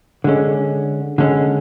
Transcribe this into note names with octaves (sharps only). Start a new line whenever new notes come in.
D3 G#3 C#4
D3 G#3 C#4